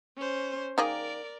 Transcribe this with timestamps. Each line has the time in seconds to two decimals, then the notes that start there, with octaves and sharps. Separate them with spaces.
0.17 C#4 C5
0.78 D#3 A#3 G#4 A#4 D5